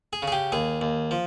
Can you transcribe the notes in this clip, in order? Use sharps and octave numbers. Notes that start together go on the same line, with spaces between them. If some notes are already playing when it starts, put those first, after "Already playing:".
G#4
C#3
G#4
G4
D#2 G#4
D#2
F3